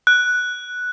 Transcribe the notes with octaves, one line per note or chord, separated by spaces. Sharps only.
F#6